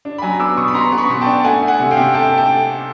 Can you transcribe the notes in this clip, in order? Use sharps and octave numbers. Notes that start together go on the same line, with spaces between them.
D4
B5
F#3 G#5 A#5
B3 D6 E6
B2 C#6 D#6
B5
B3 A#5 C6
B3
B5 C#6
B2
G5 A5
D4
A3 F#5 G#5
A3
F#5 G#5
C3
F5 G5
C3
A3 G5 A5
A3
G5 A5